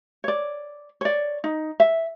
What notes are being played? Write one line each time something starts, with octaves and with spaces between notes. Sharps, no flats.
C#5 D5
C#5 D5
D#4
E5